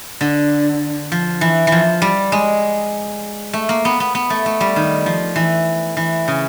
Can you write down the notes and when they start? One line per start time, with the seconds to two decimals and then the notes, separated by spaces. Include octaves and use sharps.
0.21 D3
1.12 F3
1.41 E3
1.67 E3
1.72 F3
2.02 G3
2.32 G#3
3.53 A3
3.69 A#3
3.85 B3
4.00 B3
4.15 B3
4.30 A3
4.46 A3
4.61 G3
4.76 D#3
5.06 F3
5.36 E3
5.97 E3
6.28 C#3